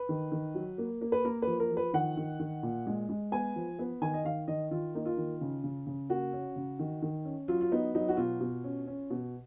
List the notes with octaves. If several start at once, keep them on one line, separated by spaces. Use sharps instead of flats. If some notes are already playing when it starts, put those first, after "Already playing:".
Already playing: B4
D#3
D#3
F#3
A#3
A#3
B4
A#3 A#4
F3 B4
A#4
F3
B4
D#3 F#5
D#3
D#3
A#2
G#3
G#3
B3 G#5
F3
B3
D#3 G#5
D#5
D#3 F5
D#3 D#5
D#3 F4
A#3 D#4
F4
D#3
C#3
C#3
C#3
A#3 F#4
C#4
C#3
D#3
D#3
C#4
F#3 F4
F4
B3 D#4
F#3 D#4
F#4
B2 F4
B2
C#4
C#4
B2